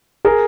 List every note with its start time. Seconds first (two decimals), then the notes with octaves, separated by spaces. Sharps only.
0.25 G#4 A#4